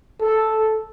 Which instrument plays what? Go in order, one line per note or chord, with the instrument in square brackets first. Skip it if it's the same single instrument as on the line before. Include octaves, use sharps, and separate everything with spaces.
[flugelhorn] A4